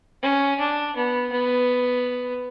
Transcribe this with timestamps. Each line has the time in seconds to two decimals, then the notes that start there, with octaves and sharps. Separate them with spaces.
0.23 C#4
0.59 D4
0.96 B3
1.32 B3